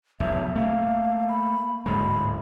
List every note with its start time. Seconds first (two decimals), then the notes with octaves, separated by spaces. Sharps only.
0.20 F1 B1 E2 E5
0.56 A3 A#3 F5
1.29 B5
1.86 D1 G#2 G#3 B5